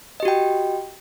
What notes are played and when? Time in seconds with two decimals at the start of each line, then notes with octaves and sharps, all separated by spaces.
0.20 D#5
0.23 G4
0.25 F#4
0.28 G5